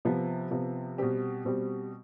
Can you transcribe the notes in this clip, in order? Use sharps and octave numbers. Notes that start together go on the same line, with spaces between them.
C3 F3 B3
C3 F3 B3
B2 G3 C4 G4
B2 G3 C4 G4